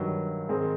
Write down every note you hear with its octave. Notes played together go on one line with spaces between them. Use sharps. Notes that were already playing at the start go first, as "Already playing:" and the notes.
Already playing: G2 D#3 F#3
G#2 D#3 G#3 C4